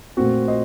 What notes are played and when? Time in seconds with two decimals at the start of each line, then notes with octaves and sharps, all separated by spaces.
0.17 A#2 A3 C4 F#4
0.48 C5 D#5